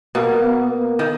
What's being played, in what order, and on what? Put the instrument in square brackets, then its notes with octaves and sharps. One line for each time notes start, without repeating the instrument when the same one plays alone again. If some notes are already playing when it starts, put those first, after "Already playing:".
[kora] B2 [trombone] A#3
[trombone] B3
A#3
[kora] D#3